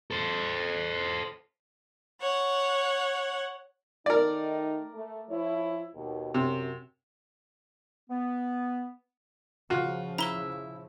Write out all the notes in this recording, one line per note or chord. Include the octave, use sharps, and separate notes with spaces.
A4 C5
C#5 F#5
D#3 A3 D#4 A#4 D5
A3
F3 E4 C#5
D#2 B2
F#2 C3
B3
C#3 F3 F4 F#4
E4 E5 A#5 G7